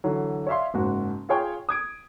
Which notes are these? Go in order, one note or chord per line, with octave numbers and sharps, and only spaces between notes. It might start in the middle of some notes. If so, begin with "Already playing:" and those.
D3 E3 F#3
C#5 D5 E5 F5 C6
F#1 G#2 F#4
F4 G#4 C#5 G5
D#6 G#6 D7